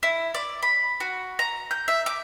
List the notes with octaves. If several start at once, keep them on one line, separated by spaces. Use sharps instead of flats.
E4
D5
B5
F#4
A#5
G6
E5
D6